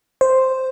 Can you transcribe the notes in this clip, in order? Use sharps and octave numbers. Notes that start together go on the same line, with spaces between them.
C5